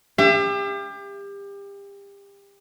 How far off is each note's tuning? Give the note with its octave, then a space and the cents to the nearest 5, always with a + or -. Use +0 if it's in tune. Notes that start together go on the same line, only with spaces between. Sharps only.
G4 +30 E5 +40